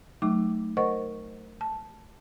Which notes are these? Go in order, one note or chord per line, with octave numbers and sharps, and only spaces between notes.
F#3 A3 D#4 D6
A#4 C5 D#5 F#5 C#6
A5